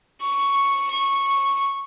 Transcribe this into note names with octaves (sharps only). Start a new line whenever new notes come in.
C#6
C#6